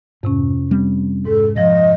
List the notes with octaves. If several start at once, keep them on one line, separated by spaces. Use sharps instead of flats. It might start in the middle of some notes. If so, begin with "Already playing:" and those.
F2 G#2 C3 C#4
G3 C4
G#2 G#3 A4
G#2 F3 D#5 A#6